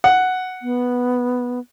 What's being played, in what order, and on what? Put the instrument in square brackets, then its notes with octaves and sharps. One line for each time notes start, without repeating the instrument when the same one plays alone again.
[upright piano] F#5
[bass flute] B3